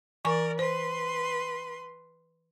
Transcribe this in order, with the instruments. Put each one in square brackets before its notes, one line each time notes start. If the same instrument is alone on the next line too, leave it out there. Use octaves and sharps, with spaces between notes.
[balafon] E3 G#5 C#6 [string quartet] A#4 D5
[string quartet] B4 C6 [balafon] C5